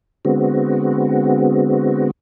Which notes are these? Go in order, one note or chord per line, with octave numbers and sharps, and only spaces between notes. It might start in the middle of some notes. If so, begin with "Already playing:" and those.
D3 G#3 B3 C4 F#4